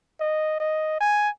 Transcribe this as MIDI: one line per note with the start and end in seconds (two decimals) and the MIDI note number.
0.20 0.59 75
0.60 0.97 75
1.01 1.29 80